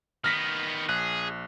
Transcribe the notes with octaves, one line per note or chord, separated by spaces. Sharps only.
D#3 B3 F6 A#6 B6
A#1 G#4 F#6